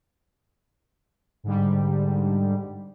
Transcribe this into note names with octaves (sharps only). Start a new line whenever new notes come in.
G#2 D3 G3